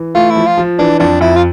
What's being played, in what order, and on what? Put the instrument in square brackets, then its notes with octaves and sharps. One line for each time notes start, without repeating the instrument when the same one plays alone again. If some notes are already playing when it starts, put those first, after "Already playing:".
Already playing: [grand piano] E3
[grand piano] A3 [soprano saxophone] F4
[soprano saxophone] E4
[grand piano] F3
[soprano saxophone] F4
[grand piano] F3
[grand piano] E3 [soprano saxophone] D4
[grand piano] F2 [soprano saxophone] D4
[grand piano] F2 [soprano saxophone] E4
[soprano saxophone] F4